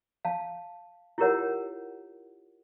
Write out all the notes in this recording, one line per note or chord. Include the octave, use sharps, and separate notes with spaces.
F5 A5
E4 F4 G4 A#4 C#5 F#5